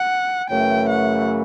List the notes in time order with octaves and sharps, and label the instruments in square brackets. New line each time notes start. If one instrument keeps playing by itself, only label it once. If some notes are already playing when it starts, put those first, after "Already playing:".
Already playing: [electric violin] F#5
[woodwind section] F#2 C#3 E3 A3 [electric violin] G5
[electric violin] F#5